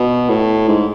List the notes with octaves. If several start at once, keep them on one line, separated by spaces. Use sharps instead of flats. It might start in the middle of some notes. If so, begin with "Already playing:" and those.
Already playing: B2
A2
G#2